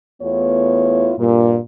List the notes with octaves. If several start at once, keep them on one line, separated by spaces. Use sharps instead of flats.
E2 A3 B3 E4 F4 C#5
G2 A#2